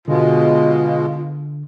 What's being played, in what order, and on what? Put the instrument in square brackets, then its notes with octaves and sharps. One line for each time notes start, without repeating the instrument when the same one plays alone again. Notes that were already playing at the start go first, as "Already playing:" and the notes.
[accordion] B2 G#3 [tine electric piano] D3 [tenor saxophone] F4